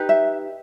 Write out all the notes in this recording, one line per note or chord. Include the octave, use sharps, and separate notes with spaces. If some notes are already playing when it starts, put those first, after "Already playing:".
Already playing: D#4 G4 B4
E5